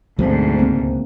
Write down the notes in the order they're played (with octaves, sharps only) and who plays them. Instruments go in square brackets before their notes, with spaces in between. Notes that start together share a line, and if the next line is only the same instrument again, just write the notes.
[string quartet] D2 G#2 [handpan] B2 C4 C5 [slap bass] F#3 B3 D4
[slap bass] C#2 [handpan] A#3 C4